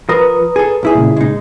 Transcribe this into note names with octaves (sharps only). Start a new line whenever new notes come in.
F3 A#4 B4 A#5 D#6
G#4 A4
B1 E4 G#4
A#2 C#3
G#3 D#4